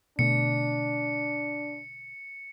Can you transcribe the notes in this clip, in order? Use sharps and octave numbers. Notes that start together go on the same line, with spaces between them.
B2 D3 A3 D4 C#7